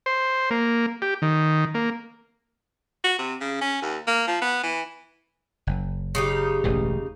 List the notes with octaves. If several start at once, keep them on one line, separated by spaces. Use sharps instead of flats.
C5
A#3
G4
D#3
A#3
F#4
C3
C#3
C#4
D#2
A#3
F3
B3
E3
F#1
C#3 D#4 G4
E1 A1 E3